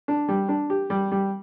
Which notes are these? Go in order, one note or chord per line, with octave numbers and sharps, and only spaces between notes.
D4
G3
D4
G4
G3
G3